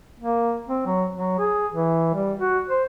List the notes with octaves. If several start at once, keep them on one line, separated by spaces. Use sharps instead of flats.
A#3
C4
F#3
F#3
G#4
E3
G3
F#4
C5